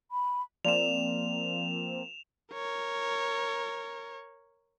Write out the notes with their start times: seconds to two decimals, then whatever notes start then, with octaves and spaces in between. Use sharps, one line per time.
0.11 B5
0.65 F3 A#3 C4 D5 E7 F7
2.53 A#4 C#5